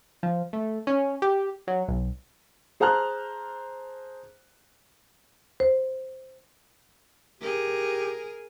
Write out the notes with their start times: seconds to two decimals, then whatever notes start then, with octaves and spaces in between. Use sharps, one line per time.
0.23 F3
0.53 A3
0.87 C#4
1.22 G4
1.67 F#3
1.88 B1
2.80 G#4 C5 A5 A#5 F6 F#6
5.60 C5
7.41 G4 G#4 A#4